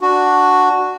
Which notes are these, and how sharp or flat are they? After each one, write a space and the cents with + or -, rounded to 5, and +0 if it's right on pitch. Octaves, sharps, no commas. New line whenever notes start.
D4 +0 F#4 +0